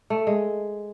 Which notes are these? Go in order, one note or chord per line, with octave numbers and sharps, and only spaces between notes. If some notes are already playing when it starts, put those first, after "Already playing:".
A3
G#3